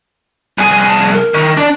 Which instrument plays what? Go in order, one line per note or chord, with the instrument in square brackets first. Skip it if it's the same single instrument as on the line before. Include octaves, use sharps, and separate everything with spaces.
[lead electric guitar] C2 G#4 [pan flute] G#5
[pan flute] A5
A#4
[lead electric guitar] D#3
D4 D5